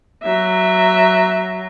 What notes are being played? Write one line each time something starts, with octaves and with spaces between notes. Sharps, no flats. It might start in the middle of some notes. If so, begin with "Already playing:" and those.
F#3 E5